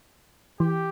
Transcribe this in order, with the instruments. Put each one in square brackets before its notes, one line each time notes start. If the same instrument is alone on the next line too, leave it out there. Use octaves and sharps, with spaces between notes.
[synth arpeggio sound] E3 [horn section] G4